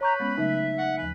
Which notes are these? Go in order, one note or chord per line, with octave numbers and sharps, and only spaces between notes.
B4 C#5 A#5 C#6 G6
G#3 B3 C#4 B5
C#3 F#3 A3 D#4 E5
F#5
D#2 F3 B4 G#5